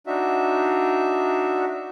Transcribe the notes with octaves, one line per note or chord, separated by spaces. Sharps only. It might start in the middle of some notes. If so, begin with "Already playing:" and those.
D4 D#4 F#4 E5